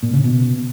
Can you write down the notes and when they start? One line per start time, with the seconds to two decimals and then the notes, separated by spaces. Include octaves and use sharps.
0.03 A#2
0.13 C#3
0.24 B2